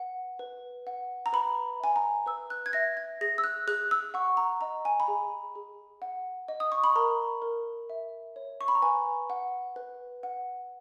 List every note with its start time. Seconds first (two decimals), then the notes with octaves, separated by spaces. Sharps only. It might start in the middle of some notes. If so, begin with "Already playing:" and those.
Already playing: B4 F#5
0.39 B4
0.87 F#5
1.26 A#5
1.33 B4 B5
1.80 E5 G#5
1.96 A#5
2.26 B4 E6
2.50 F#6
2.66 G#6
2.73 E5 A#6
2.97 G#6
3.21 G#4 A#6
3.38 E6
3.44 F#6
3.67 G#4 F#6
3.91 E6
4.14 F#5 C#6
4.37 A#5
4.61 D#5 A#5
4.85 G#5
5.00 B5
5.08 G#4 A#5
5.55 G#4
6.02 F#5
6.48 D#5
6.60 D#6
6.72 C#6
6.84 B5
6.96 A#4 A#5
7.42 A#4
7.90 E5
8.36 C#5
8.61 C#6
8.68 B5
8.75 A#5
8.82 B4 G#5
9.30 F#5
9.76 B4
10.23 F#5